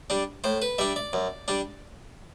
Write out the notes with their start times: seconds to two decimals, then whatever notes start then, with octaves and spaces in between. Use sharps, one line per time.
0.10 G3 D4
0.44 A2 C5
0.62 B4
0.78 G3 D4 E5
0.96 D5
1.13 F#2
1.48 G3 D4